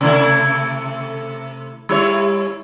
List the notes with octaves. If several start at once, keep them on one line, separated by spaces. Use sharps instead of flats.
C3 A3 E4
G3 E4 C#5